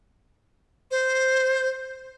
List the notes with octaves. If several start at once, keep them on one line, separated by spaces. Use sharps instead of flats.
C5